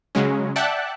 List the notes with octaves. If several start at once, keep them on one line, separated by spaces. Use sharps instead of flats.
C#3 F#3 G#3 C#4
D5 E5 F#5 G5 A5 F#6